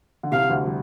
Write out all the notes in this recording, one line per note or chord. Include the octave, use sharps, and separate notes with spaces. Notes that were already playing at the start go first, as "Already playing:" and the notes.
D3
C2 C3 F5
D2 D3
G3